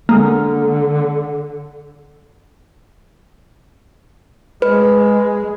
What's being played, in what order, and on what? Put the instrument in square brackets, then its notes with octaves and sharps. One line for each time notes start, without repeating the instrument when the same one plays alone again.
[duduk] D3 [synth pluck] G#3 A#3
[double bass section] G#3 [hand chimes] B4